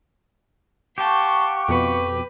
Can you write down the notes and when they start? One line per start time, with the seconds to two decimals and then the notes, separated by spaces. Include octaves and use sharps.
0.98 G4 F5 F#5 A5 C6 C#6
1.68 F2 B2 B4